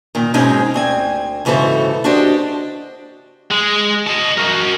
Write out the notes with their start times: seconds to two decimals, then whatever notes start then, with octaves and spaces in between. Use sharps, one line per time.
0.15 A#2 D#3
0.34 G#2 B2 G#3 C4 C#4 D#4
0.74 D2 C4 G#5
1.45 G#2 C#3 E3 F#4 A4 C5
2.04 D4 F#4 G4 C5 D#5
3.51 G#3
4.07 D#5 A5
4.37 F#4 A#4